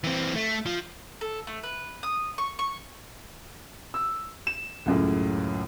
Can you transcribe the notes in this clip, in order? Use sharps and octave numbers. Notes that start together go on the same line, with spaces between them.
E3 C4
A3
F3
A4
A3
B4
D#6
C#6
C#6
E6
E7
C#2 F#2 A2